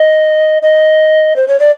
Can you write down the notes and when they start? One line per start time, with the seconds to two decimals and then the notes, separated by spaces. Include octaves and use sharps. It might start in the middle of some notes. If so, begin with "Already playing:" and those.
Already playing: D#5
0.62 D#5
1.36 C5
1.48 C#5
1.60 D5